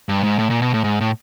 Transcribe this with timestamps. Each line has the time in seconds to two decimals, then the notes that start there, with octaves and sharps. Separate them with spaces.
0.09 G2
0.24 G#2
0.39 A2
0.50 A#2
0.62 B2
0.74 A2
0.84 G#2
1.01 A2